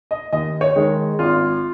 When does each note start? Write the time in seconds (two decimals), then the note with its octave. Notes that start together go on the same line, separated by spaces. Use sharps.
0.11 D#5
0.32 D#2 D#5
0.61 C#5
0.76 D#3 G#3
1.19 G#1 F4